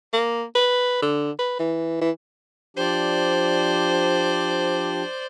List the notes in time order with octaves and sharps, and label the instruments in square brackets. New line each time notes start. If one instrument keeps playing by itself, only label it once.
[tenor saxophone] A#3
B4
D3
B4
E3
E3
[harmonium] F3 D4 G4 [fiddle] C5 D5